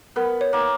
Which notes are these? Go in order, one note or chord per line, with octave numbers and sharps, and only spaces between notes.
B3 A#4
C#5
A#3